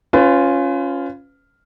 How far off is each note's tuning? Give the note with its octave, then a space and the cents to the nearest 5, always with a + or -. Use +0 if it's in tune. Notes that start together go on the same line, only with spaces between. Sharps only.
C#4 +0 F4 +0 B4 +35